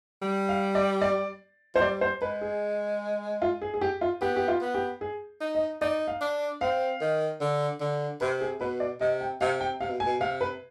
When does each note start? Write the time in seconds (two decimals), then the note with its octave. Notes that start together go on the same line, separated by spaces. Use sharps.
0.22 G3
0.49 F5
0.75 D5
1.02 D5
1.75 F3 C5
1.82 G3 D5
2.01 C5
2.22 G#3 B4
2.41 G#4
3.42 F4
3.62 G#4
3.74 G#4
3.81 G4
4.01 F4
4.21 B3 G4
4.36 G4
4.48 F4
4.61 B3
4.74 G4
5.01 G#4
5.41 D#4
5.55 D#5
5.81 D#4 D5
6.08 F5
6.21 D4
6.61 C4 F5
7.01 D#3
7.41 D3
7.80 D3
8.21 C3 B4
8.41 G#4
8.60 B2 B4
8.80 D5
9.01 C3 D#5
9.21 G5
9.41 C3 F5
9.61 G5
9.81 C3 F5
9.89 B2
10.00 G#5
10.06 B2
10.20 C3 F5
10.41 B4